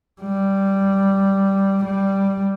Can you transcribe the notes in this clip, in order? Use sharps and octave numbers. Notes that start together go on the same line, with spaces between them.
G3
G3